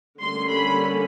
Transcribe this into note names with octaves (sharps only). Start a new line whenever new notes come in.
D3 G3 A#3 C#4 C6
B5